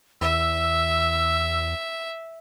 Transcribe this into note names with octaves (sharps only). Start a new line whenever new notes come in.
E2 E5 E6